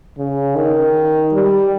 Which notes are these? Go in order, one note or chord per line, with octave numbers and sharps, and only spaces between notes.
C#3
D#3
G3